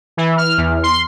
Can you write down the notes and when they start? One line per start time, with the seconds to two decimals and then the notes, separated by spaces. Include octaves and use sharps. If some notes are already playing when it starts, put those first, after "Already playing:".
0.17 E3
0.38 F6
0.58 E2
0.83 C6